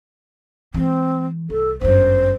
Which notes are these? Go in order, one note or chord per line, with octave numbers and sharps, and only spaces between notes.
E3 G#3 C4
C2 A4
G1 F#2 C5